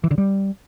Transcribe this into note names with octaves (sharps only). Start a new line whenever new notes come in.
E3
D3
G3